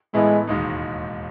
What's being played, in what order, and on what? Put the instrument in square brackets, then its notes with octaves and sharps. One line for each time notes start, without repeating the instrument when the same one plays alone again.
[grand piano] A2 E3 B3 E4 [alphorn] G#3
[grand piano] E1 D#2 D#3 G#3 D#4